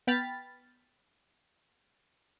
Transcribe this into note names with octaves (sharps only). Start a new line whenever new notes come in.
B3 G5 B5 F6 A6 B6